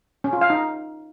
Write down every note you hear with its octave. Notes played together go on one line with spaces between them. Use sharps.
C#4
F4
F5
D#4